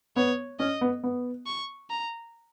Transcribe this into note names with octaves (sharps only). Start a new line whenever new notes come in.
B3 C#5
C#4 D#5
B3
B3
C#6
A#5